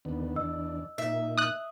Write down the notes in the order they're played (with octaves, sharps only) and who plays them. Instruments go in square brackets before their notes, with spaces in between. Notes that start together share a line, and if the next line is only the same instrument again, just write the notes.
[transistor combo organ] D#2 D3 B3
[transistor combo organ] E2 D4 [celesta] D#5 E6
[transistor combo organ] A#2 D#4 [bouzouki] E5
[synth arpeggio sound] D#6 F#6